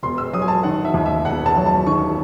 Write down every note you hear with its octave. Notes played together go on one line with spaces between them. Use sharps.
E1 C6
E6
F#3 D#6
G#5
A5
D#3 F#5
E5
D#2
E5
E1 F#5
A5
F#3
A5
D#3 C#6